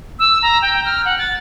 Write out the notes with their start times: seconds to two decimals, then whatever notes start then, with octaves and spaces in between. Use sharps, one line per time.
0.19 E6
0.42 A#5
0.62 G5
0.85 F6
1.05 F#5
1.19 A6